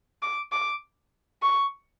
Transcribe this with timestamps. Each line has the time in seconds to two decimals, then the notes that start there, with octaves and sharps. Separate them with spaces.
0.22 D6
0.52 D6
1.43 C#6